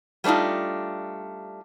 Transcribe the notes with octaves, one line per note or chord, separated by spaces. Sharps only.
G3 A3 D4 D#4 F4